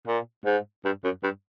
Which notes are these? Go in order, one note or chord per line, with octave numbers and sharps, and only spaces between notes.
A#2
G#2
G2
F#2
G2